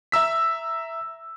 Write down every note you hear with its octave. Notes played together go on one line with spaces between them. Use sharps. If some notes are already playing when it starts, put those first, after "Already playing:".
E5 A#5 E6 B6